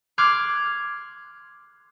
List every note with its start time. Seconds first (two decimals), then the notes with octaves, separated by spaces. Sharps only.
0.18 C6 D6 F6 F#6 G#6